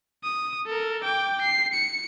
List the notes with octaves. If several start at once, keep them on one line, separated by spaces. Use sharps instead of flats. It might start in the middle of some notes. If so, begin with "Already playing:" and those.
D#6
A4 A#4
G5 D6
C7
C#7